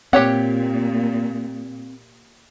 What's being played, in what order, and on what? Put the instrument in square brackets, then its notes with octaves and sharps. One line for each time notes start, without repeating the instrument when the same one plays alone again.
[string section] A#2 [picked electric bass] C4 [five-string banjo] G4 C#5 F#5